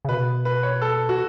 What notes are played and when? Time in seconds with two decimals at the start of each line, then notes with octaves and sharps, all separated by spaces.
0.05 C#3
0.08 B2 B4
0.45 B4
0.63 C#5
0.81 A4
1.09 F#4